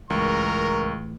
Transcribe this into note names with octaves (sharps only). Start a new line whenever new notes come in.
C#2 A2 E3 A#4 C#6